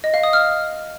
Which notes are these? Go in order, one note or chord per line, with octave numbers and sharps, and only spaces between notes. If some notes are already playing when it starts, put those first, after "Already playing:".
D#5
F5
D#6
F6